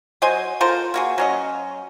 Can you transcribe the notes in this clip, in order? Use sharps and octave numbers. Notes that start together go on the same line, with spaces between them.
F#3 C5 D#5 G#5
F4 A4 A#4 C5
A#3 F#4 G#4
F#3 C#4 D#5